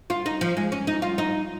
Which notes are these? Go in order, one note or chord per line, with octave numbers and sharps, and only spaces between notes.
F4
D#4
F3
G#3
C#4
D#4
F4
D#4